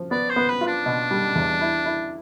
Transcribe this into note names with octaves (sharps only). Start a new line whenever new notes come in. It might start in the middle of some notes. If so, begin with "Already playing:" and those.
Already playing: F3
B3 D5
C5
B3
B4
F4
D4
B2
G3
E2
E4
E4